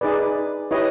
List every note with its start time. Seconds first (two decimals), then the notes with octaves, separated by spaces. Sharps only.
0.01 D#4 G#4 B4 D5
0.71 E4 G4 B4 C#5 D#5